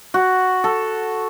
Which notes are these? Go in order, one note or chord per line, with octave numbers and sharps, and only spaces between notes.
F#4
A4